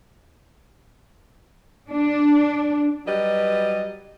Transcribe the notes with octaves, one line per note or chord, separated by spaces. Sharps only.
D4
F#3 G3 B4 D#5